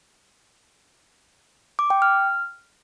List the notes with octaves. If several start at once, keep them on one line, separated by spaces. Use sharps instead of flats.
D6
G5
F6